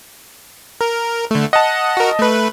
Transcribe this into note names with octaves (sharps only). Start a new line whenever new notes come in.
A#4
D3 A3
D#5 F#5 A5
F#4 A#4
A3 B4